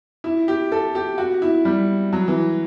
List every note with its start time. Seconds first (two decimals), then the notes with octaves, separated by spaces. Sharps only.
0.24 E4
0.48 G4
0.72 A4
0.95 G4
1.18 F#4
1.42 E4
1.65 G3
2.13 F#3
2.28 E3